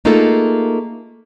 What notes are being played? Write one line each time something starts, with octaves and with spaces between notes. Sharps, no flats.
A3 A#3 D#4 F4 G#4 A4